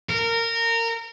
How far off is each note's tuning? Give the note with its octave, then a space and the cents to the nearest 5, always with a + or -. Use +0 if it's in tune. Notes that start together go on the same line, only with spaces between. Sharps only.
A#4 -20